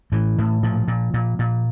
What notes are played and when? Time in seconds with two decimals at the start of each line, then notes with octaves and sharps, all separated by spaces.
0.12 A2 E3
0.38 A2
0.63 A#2 F3
0.88 A#2
1.14 A#2
1.39 A#2